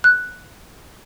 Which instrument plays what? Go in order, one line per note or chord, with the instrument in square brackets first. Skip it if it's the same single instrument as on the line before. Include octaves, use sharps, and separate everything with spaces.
[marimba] F#6